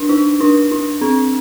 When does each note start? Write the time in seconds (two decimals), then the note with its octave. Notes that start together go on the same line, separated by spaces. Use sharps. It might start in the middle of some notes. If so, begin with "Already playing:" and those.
Already playing: D4
0.09 D#4
0.40 D4
0.72 D4
1.01 C4